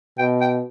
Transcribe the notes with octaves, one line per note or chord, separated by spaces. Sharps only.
B2 G5
G5